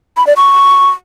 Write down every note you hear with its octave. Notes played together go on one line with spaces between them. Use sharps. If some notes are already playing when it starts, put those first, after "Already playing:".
B5
D5
C#6